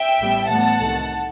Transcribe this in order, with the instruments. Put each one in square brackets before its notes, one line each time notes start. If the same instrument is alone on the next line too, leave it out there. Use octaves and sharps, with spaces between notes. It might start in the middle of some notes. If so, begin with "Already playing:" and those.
Already playing: [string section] E5 G5
A1 A2 G3 B3
A1 A2 G3 B3 F#5 A5
C2 C3 D#3 A3